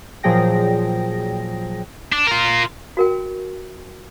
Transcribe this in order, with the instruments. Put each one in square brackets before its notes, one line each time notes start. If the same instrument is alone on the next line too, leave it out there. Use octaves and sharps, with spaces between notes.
[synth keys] A#2 F3 F#3 G#4 G5 A#6
[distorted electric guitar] D4
F4 A#4
[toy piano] F#4 A#4 G5